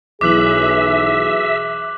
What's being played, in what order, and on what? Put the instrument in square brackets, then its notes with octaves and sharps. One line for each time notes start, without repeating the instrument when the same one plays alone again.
[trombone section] B1 E3 [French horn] G#4 [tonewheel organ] E5 [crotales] D6 F#6 F#7